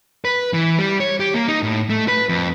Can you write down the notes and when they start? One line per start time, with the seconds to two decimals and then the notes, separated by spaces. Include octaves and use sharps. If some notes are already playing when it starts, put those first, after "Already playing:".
0.25 B4
0.53 E3
0.79 G3
1.00 C#5
1.20 G4
1.34 A#3
1.48 D#4
1.63 A2
1.90 A3
2.08 B4
2.29 F2